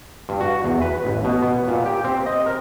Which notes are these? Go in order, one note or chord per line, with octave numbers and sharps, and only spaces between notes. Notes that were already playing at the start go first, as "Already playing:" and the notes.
G2
F#4
E2
B4
A1
B2
B3
A#2
G4
C4
D#5
A#4